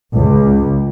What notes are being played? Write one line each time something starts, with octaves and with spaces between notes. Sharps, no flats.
C#2